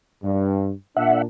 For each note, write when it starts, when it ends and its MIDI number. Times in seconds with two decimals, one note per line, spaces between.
0.22 0.70 43
0.96 1.25 46
0.96 1.25 62
0.96 1.22 76
0.96 1.22 78